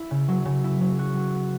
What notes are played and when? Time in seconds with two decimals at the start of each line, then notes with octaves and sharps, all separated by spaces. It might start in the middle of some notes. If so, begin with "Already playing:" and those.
Already playing: E4
0.11 C#3
0.28 F#3
0.45 C#3
0.64 E4
0.81 F#3
0.99 F#4
1.17 F#3
1.34 B3